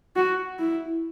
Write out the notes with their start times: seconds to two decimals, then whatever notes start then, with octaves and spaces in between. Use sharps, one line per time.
0.16 F#4
0.59 E4